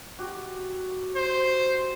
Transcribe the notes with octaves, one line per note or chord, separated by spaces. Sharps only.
F#4 G4
C5